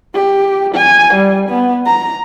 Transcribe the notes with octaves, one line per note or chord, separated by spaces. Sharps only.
G4
G#5
G3
B3
A#5